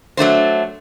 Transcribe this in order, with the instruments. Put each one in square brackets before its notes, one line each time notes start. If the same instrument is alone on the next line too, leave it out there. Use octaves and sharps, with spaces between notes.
[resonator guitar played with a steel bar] F#3 A3 D4 C5